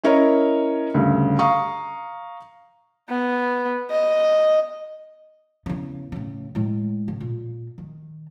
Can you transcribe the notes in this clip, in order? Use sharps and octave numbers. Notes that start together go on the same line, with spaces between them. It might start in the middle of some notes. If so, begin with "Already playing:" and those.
C#4 E4 A#4 C#5 D#5 A#5
D2 G2 C#3
F5 A#5 C#6 D#6
B3
D#5
E2 C#3
A2 C#3
A2 G#3
C#3
A#2
D#3